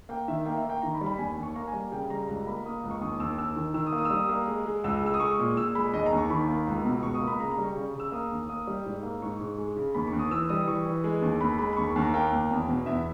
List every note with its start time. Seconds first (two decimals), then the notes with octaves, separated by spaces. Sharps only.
0.09 A#3 G5
0.28 D#3 E5
0.45 A#3 G5
0.57 E5
0.65 A#3 G5
0.82 D#3 A#5
0.94 B5
1.01 G3
1.06 B5
1.18 D#2 G#5
1.37 D#2
1.43 C#6
1.56 A#3 A#5
1.68 G#5
1.73 G3
1.92 C#3 G5
2.10 G3 A#5
2.28 C#2 A#5
2.47 A#3 B5
2.65 A#3 D#6
2.84 C#2
2.91 C#6
3.01 D#2 D#6
3.20 D#2 E6
3.38 D#2 E6
3.56 D#3
3.74 D#3 E6
3.87 D#6
3.92 A#3
3.98 D#6
4.05 E6
4.10 G3 D#6
4.29 A#3
4.48 G#3
4.66 G#3
4.84 C#2 E6
5.02 G#3 E6
5.14 D#6
5.20 G#3 C#6
5.39 A#2
5.57 A#2 E6
5.75 G#3 B5
5.93 D#2 D#5
6.06 A#5
6.12 D#2
6.18 C#6
6.30 D#3 B5
6.49 A#3
6.67 C#2
6.84 B2
7.03 C#2 C#6
7.15 D#6
7.21 A#3
7.27 B5
7.40 C#3 A#5
7.51 A#5
7.58 G3
7.64 C#6
7.76 C#3
7.94 C#3
8.00 E6
8.12 A#3 D#6
8.31 D#2
8.49 A#3 D#6
8.67 G3
8.86 G#2
9.03 A#3
9.22 G#2 C#6
9.41 G#2
9.58 G#3
9.76 C#3
9.94 D#2 B5
10.07 C#6
10.13 D#2
10.19 D#6
10.31 E3 E6
10.49 G3 D#6
10.67 E3 C#6
10.86 E3
11.04 G#3
11.22 D#2
11.41 D#2 B5
11.59 G#3 B5
11.73 B5
11.77 D#2 C#6
11.96 D#2
12.02 A#5
12.14 A#3 G5
12.32 D#2
12.51 E2
12.69 B2
12.86 E2 E5